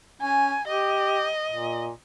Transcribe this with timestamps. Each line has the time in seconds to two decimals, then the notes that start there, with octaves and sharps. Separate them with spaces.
0.22 C#4 G#5
0.68 G4 D#5
1.52 A#2